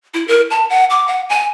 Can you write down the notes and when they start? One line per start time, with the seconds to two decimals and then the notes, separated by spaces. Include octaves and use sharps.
0.14 E4
0.28 A#4
0.51 A5
0.70 F#5
0.90 D6
1.08 F#5
1.29 G#5